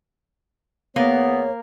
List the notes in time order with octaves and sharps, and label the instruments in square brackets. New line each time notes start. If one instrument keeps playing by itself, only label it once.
[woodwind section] E2 B3 [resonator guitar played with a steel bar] A#3 [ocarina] C#5